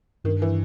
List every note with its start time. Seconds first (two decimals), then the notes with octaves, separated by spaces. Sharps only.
0.24 G2 D#3
0.42 E3